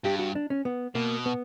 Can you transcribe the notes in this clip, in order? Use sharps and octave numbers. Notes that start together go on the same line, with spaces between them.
G2 G4
F#4
D4
C#4
B3
B2 A#3
B3